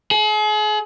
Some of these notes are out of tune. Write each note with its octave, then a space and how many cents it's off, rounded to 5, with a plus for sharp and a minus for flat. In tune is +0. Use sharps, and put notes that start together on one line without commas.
G#4 +40